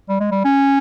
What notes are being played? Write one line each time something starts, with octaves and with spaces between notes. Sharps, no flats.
G3
G#3
G3
C#4